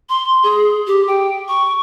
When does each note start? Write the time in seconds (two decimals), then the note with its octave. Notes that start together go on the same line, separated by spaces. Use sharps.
0.09 C6
0.43 G#4
0.87 G4
1.08 G5
1.48 C#6